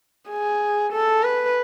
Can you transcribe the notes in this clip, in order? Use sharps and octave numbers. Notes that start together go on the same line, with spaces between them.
G#4
A4
B4